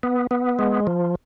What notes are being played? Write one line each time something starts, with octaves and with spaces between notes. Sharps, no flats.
B3
B3
G#3
F3